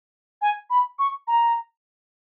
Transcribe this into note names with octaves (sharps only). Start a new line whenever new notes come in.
G#5
B5
C#6
A#5